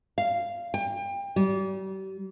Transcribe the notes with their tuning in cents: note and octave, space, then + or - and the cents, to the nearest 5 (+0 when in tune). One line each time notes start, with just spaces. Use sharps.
F5 -10
G5 +30
G3 -40